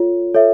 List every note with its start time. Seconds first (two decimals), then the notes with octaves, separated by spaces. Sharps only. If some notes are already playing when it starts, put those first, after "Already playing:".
Already playing: F4 A4 C#5
0.34 A4 C#5 E5